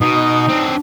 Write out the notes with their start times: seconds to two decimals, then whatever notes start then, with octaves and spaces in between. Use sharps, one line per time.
0.01 B2 D#4
0.49 C4 D4